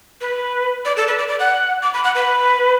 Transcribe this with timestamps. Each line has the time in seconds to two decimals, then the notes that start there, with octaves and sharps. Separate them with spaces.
0.21 B4
0.85 D5
0.97 A4
1.08 B4
1.18 D5
1.28 D5
1.40 F#5
1.83 D6
1.94 B5
2.04 F#5
2.15 B4